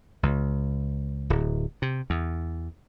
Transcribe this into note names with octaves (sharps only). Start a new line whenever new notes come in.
C#2
D1
C3
E2